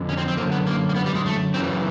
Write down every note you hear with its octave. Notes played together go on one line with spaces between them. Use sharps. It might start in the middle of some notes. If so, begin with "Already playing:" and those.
Already playing: F2 D3
C#4
C4
C4
F#2 D3 A#3
B3
A#3
A#3
B3
G3
G#3
A3
F#2 C#3 E3 C4